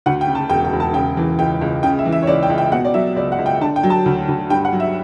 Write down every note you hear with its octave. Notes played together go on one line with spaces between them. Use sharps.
D2 F#5
G5
C#3
A5
E1 G5
G5
E1
A5
C#3 G5
E3
C#2 G5
C#2
C#3 G5
E5
E3
E5
C#5
C#2 D5
G5
C#2
G5
B2 F#5
D5
F#3 E5
C#2 D5
F#5
C#2
G5
D3 A5
G5
F#3
A5
D2
D2
G2 G5
F#5
F#3
E5